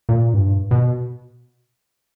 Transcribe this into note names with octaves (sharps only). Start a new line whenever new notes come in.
A#2
G2
B2